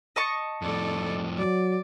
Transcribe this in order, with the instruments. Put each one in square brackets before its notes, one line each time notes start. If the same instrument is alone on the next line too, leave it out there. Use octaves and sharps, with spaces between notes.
[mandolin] D#5 A5 C#6
[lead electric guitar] F2 A2 [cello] A4 D5
[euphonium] F#3 [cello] D5